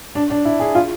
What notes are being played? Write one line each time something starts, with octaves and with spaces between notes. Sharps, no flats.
D4
D4
E4
G#4
F4